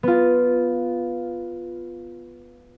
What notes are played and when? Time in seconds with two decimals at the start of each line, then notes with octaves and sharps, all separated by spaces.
0.03 B3 F4